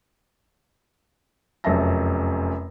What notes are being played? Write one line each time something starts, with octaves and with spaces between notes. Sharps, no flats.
F1 F#2 C#4 E5 A5 A#6